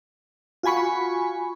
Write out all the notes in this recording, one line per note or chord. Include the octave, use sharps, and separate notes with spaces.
F4 F#4 G#5 B5 C#6